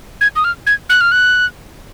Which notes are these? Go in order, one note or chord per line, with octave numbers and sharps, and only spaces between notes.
G#6
D#6
F6
G#6
F#6
F6
F#6